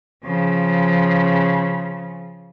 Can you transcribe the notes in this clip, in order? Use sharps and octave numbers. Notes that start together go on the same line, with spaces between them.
C#3 F3